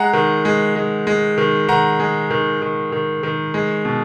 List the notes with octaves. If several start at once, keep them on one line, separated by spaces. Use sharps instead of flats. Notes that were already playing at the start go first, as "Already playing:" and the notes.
Already playing: G#3 F#5 A#5
D#3
G#3
G#3
G#3
D#3
D#3 F#5 A#5
G#3
D#3
D#3
D#3
D#3
G#3
B2